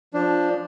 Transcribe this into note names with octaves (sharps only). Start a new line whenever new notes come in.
F3 D4